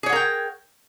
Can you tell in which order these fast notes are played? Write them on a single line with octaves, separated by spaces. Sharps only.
G#4 C#5 F#5 A#4 G5